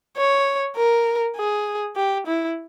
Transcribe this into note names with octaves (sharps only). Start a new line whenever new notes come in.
C#5
A#4
G#4
G4
E4